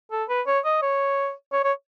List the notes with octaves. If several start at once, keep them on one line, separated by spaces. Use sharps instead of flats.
A4
B4
C#5
D#5
C#5
C#5
C#5